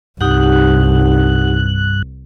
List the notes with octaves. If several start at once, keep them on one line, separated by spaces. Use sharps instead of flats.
C2 G2 D#4 G4 F#5 F#6